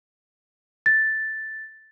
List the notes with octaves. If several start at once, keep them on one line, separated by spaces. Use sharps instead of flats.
A6